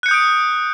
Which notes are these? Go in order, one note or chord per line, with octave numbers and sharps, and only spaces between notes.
D#6 F#6 G6 C#7 D7